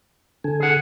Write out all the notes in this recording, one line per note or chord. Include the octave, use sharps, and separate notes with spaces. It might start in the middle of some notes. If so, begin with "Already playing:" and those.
D3 A4 G#5
G#4 F#5